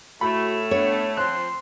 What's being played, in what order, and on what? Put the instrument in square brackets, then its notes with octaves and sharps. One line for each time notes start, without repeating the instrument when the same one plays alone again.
[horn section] A2 A3 [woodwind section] F#4 [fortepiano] B5
[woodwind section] B3 D4 [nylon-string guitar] C#5
[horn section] F3 C4 [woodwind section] C6 [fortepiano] F#6